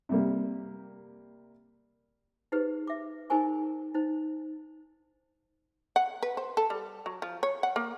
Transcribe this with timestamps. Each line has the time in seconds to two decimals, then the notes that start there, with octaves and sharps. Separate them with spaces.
0.09 C3 G3 A#3
2.52 D#4 G4 G#4 B4 C5
2.87 E5 D6
3.30 D#4 G#4 A#4 C5 G#5 C#6
3.94 D#4 C5
5.96 F#5
6.23 B4
6.37 C5
6.57 A4
6.70 G3
7.06 F#3
7.22 F3
7.43 C#5
7.63 F#5
7.76 A#3